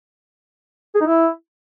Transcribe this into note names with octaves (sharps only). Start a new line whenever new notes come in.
G#4
D#4
E4